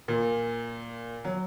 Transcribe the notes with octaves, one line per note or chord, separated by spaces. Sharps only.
A#2
F#3